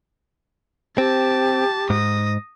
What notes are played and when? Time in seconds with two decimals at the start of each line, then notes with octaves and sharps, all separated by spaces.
0.98 C4 G4 A5
1.90 G#2 D#6 A#6